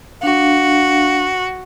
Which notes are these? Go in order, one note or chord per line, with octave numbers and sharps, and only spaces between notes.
D4 F#4 F5